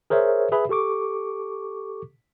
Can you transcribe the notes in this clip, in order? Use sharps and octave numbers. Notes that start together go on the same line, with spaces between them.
G#4 A#4 C5 C#5 E5
G#4 B4 E5 B5
G4 A4 C#6 D6